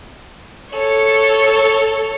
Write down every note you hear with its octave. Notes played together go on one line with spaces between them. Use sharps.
A4 C#5